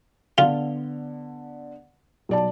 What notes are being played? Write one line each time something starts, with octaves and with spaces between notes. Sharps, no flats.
D3 B3 F4
B1 D5 A5